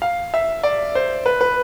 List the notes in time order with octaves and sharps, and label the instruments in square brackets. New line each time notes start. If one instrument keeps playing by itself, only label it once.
[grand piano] F5
E5
D5
C5
B4
B4